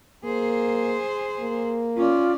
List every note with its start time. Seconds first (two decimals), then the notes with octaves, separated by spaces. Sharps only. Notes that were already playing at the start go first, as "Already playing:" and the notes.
0.24 A#3 G#4 C5
1.40 A#3
1.97 C#4 F4 D5